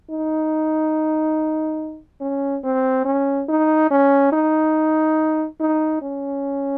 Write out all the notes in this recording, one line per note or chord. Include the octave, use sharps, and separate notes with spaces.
D#4
C#4
C4
C#4
D#4
C#4
D#4
D#4
C#4